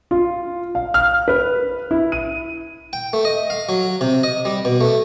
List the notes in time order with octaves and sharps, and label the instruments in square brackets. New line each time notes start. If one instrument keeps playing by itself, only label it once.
[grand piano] F4
F5
F6
B4
E4
D#7
[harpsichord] G5
A3
D#5
F5
F#3
C3
D#5
G3
B2
A3